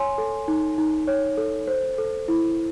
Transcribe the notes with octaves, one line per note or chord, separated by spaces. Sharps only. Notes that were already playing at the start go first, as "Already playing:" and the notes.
Already playing: C#5 G#5 C6
A4
D#4
D#4
C#5
A4
C5
A4
E4